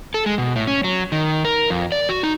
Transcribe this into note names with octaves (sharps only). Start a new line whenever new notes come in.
A4
G#3
B2
A2
C#4
F#3
D#3
A#4
F2
D5
F#4
D#4